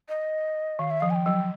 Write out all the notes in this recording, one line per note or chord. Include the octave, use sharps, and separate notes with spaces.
D#5
D#3 F5
E5
F3 F5
G#5
G5
F#3